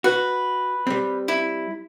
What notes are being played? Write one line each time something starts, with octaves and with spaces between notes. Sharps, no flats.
F#4 B4
G3 C4
E4